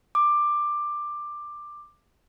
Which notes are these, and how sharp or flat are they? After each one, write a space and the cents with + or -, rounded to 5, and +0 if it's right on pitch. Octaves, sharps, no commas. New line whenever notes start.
D6 +15